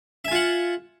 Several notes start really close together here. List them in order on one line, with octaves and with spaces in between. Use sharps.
E5 G#5 F4 F#5